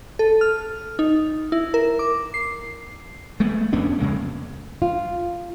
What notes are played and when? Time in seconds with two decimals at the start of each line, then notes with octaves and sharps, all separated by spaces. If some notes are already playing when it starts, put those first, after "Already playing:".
0.19 A4
0.41 F6
0.99 D#4
1.52 E4
1.74 A#4
1.99 D6
2.34 C7
3.40 G#3 A3 B3
3.73 F2 B3 C#4 D4
3.99 F2 C#3 G#3 A#3
4.82 F4